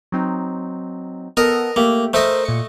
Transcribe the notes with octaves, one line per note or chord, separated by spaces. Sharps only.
F#3 C4 D#4
B3 A4 A#4 D#5
A3 A#3 G4
A3 A4 A#4 C5 D#5 E5
A#2 C#7